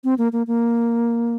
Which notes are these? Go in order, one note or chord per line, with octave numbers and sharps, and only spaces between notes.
C4
A#3
A#3
A#3